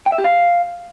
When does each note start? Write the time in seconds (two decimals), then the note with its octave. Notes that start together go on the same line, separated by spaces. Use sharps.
0.06 G5
0.12 E5
0.18 G4
0.24 F5